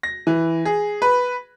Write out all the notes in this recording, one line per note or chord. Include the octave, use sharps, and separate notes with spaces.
A#6
E3
G#4
B4